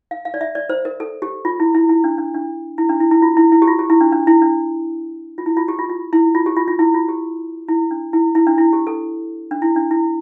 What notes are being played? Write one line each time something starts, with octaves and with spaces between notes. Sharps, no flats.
F5
F5
D5
E5
D5
C5
A#4
A4
G4
F4
E4
E4
E4
D4
D4
D4
E4
D4
E4
E4
F4
E4
E4
G4
F4
G4
E4
D4
D4
E4
D4
F4
E4
F4
G4
F4
F4
E4
F4
G4
F4
F4
E4
F4
G4
E4
D4
E4
E4
D4
E4
G4
A4
D4
E4
D4
E4